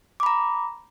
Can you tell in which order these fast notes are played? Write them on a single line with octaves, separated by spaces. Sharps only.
D6 B5 A#5